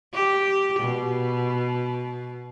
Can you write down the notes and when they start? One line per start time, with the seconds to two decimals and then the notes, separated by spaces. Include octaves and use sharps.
0.14 G4
0.79 B2